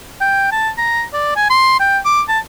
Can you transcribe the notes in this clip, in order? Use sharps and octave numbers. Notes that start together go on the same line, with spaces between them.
G5
A5
A#5
D5
G#5
C6
G5
D6
A5